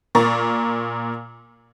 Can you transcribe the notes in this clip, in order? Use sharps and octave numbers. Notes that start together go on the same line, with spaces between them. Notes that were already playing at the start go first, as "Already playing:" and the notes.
A#2 A#4 C#6 A6